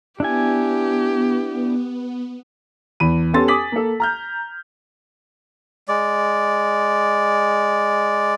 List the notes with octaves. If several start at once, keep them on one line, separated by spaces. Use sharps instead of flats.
B3 D4 E4 G4 G#5
E2 B5 D#7
B3 C#4 G4 A4 C6 A6
G#5 D6 D#6 B6 F#7
A#3 A4
A#5 F6 G6
G#3 D5